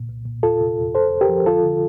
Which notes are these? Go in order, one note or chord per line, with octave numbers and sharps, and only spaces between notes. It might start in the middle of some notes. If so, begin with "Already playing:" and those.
Already playing: A#2
C2
A#2
E2 F4 A4
C3
E2
F2 A4 C5
F2
G4 A#4
F3
D3 F4 A4
D3